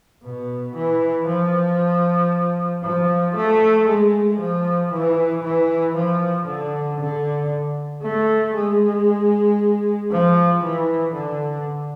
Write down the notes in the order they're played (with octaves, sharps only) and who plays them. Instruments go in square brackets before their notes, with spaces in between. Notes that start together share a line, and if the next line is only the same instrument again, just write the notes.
[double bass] B2
E3
F3
F3
A3
G#3
F3
E3
E3
F3
D3
D3
A3
G#3
F3
E3
D3